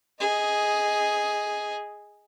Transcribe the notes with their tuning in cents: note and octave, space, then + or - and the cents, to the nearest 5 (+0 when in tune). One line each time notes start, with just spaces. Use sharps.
G#4 +0 D#5 +15